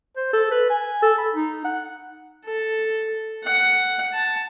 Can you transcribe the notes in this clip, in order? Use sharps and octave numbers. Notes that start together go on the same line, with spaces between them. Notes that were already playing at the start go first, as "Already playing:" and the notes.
C5
A4
B4
G#5
A4
B5
D#4
F#5
A4
F#5
A5